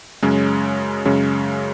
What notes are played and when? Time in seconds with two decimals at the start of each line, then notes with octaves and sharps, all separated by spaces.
0.22 F#2 C#3 G#3 C#4
1.05 F#2 C#3 G#3 C#4